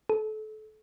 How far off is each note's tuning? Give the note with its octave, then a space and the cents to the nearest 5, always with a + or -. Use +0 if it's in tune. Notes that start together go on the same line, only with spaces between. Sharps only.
A4 -30